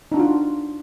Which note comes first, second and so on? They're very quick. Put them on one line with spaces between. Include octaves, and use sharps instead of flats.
D#4 D4 F#4 F4